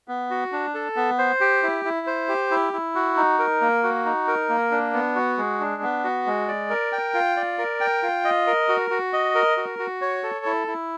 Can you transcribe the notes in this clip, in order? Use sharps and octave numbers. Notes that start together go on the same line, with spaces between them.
B3
F#4
D4
A4
B3
C5
G4
E4
E4
C5
G4
E4
E4
F#4
D#4
A#4
A#3
F#4
D#4
A#4
A#3
D4
B3
F#4
G#3
D4
B3
F#4
G#3
D5
A#4
G5
F4
D5
A#4
G5
F4
D#5
A#4
F#4
F#4
D#5
A#4
F#4
F#4
C#5
A4
E4
E4